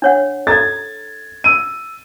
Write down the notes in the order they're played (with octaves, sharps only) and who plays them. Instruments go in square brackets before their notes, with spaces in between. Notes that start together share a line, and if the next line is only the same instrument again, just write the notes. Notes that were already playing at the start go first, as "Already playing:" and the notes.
[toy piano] D4 C#5 F#5
[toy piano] A4 A#5 [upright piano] G#6 A6
[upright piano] E6 D#7